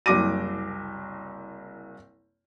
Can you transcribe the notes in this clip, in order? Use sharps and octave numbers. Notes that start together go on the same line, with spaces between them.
F#1 C2 D6 A#6 D#7